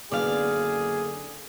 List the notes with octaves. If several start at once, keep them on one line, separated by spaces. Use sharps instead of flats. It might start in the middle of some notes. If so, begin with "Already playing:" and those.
F#1 D3 B3 D4 G#4 D5 F5